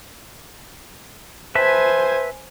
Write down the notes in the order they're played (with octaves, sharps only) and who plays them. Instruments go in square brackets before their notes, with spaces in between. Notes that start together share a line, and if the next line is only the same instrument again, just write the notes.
[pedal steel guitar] B4 E5 A5 [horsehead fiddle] C5 G#5